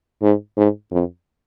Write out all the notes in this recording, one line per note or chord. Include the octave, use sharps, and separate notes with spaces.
G#2
G#2
F2